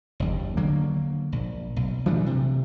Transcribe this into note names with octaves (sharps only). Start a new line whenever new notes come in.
F#1 D#2
D3 F#3 A#3
A#1
B1
E3 G3 A3 D4
C3